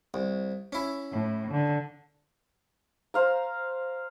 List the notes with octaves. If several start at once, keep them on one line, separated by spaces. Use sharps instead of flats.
C2
C#4 E4
A2
D3
C5 F5 A#5